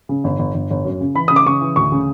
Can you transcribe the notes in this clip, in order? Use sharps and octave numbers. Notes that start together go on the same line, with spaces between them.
C#3
G1
G1
G1
G1
F#2
C#3
E3 B5
C#3 D#6
D6
C#3 C#6
E3
D2 C#6
C#3